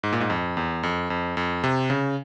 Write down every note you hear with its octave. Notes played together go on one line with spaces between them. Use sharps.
G#2
A#2
G#2
F2
E2
F2
F2
F2
C3
C#3